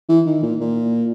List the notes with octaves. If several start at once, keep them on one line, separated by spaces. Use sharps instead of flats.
E3
D#3
A#2
A#2